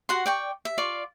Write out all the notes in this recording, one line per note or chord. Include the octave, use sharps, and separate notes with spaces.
F#4 F#5 C6
D5 G5 C#6
E5
F4 D5 F5 C#6